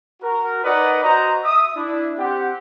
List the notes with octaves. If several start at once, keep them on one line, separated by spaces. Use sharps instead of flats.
F#4 A#4
D#4 A#4 B4 D5 D#5 F#5
F#4 C5 D#5 A#5
E5 D#6
D4 E4
C4 G4 F#5